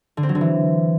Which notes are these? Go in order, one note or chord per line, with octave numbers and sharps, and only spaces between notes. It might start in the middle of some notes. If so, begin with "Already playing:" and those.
D3
C4
F#3
D3
E3